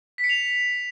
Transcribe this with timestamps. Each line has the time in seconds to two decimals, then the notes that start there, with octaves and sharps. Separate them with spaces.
0.18 B6
0.24 C#7
0.29 F7